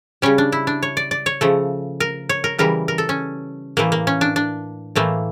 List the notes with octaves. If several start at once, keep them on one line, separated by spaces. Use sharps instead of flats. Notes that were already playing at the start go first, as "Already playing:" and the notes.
C#3 G3 C#4
D4
E4
D4
C#5
D5
D5
C#5
C#3 F3 A3
A#4
C#5
A#4
C#3 E3 G3 A#4
A#4
A4
C#4
A2 E3 A3 A#3
A#3
C#4
D4
D4
A2 E3 A3 A#3